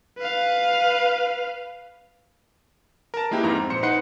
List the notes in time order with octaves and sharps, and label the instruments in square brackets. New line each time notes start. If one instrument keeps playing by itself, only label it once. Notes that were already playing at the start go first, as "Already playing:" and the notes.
[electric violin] B4 F5
[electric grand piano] A#4 A5
G#3 A#3 E4 G4 B4
F2 G#2 A#5
C4
A#1 C5 C#7
D#4 B4 C5 F#5 C7 C#7